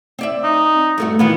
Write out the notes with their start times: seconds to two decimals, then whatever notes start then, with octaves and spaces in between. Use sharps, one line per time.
0.19 C4 D5 E5
0.44 D#4
0.98 G2 A3 F#4
1.19 D#3 E3 B3 F4